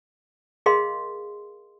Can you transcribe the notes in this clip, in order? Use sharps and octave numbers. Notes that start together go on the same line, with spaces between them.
G#4 A#4 D#5 F5 C6